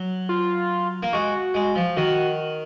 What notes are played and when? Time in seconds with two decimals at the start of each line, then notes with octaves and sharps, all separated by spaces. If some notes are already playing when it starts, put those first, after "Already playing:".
Already playing: F#3
0.29 F4
1.03 A#3
1.13 G#3 F#4
1.54 G#3
1.75 F3
1.97 D#3 F#4